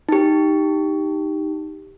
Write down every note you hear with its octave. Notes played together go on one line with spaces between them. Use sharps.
D#4 G4